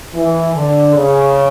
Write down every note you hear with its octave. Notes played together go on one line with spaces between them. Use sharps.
E3
D3
C#3